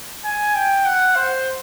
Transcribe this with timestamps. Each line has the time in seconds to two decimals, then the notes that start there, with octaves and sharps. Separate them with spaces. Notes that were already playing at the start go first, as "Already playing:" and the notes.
0.24 G#5
0.55 G5
0.85 F#5
1.15 C5